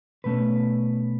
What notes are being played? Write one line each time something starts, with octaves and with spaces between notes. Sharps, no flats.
B2 A3 C#4 B4